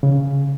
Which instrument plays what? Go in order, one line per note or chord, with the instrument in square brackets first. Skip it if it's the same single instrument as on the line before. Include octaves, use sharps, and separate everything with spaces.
[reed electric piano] C#3